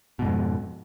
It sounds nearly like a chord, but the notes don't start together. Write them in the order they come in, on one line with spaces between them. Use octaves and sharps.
B2 G#2 F2